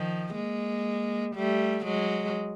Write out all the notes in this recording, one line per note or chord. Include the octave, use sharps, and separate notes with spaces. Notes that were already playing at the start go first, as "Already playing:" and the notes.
Already playing: D#3 F3
G#3 A#3
G3 A3
F#3 G#3